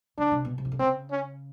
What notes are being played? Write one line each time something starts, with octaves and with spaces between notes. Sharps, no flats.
C#3 D4
C3
B2
C3
D#3
D3
C#3 C4
C#4